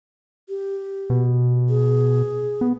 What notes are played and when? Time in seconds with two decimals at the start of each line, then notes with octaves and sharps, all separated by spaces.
0.49 G4
1.10 B2
1.69 G#4
2.61 B3